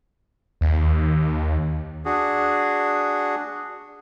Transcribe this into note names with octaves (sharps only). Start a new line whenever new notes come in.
D#2
D4 F#4 G#4